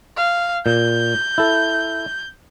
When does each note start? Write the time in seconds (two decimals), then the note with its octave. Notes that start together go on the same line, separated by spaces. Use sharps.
0.17 F5
0.66 A#2 G6
1.38 E4 A4